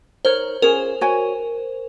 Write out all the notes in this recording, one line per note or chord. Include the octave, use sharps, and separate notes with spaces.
D#4 A#4 C5 C#5
C#4 F4 G#4 A#4
F#4 C#5 G#5